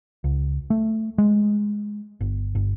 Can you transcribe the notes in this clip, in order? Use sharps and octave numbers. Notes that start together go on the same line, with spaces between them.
C#2
A3
G#3
G1
G1